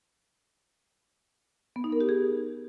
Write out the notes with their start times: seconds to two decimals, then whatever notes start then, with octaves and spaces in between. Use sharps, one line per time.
1.76 B3
1.84 D#4
1.92 A#4
2.01 G4
2.09 G#4